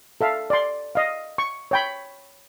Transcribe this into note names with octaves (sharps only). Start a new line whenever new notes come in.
A4 E5 F5
D5 C6
D#5 F5
C#6
C#5 G5 B5